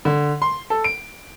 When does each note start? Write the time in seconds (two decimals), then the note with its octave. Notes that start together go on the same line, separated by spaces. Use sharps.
0.05 D3
0.42 C6
0.70 A4
0.84 D7